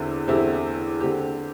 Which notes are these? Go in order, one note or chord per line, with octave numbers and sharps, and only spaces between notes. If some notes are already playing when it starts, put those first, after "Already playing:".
Already playing: E2 D3 C4 E4 G4
E2 D3 C4 E4 G4
D3 C4 G4